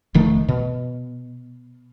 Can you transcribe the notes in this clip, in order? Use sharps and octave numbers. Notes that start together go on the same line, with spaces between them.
E1 D#3 F3 A3
B2